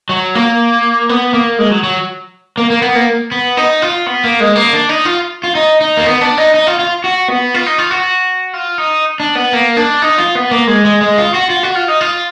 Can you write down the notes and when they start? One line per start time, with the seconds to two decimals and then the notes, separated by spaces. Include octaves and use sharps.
0.09 F#3
0.35 A#3
1.09 B3
1.34 A#3
1.59 G#3
1.71 F#3
1.84 F#3
2.57 A#3
2.70 A#3
2.82 B3
2.95 A#3
3.32 B3
3.57 D#4
3.82 F4
4.06 B3
4.24 A#3
4.40 G#3
4.56 A#3
4.73 D4
4.89 D#4
5.05 F4
5.44 F4
5.55 D#4
5.81 D#4
5.97 A#3
6.05 B3
6.21 D4
6.38 D#4
6.54 D#4
6.67 F4
6.79 F4
7.04 F#4
7.28 B3
7.54 F4
7.66 D#4
7.78 F4
7.91 F#4
8.54 F4
8.78 D#4
9.20 D4
9.35 B3
9.53 A#3
9.77 D4
10.02 D#4
10.18 F4
10.35 B3
10.51 A#3
10.68 G#3
10.85 G#3
11.01 G#3
11.18 F4
11.34 F#4
11.50 F4
11.63 F#4
11.75 F4
11.88 D#4
12.01 F4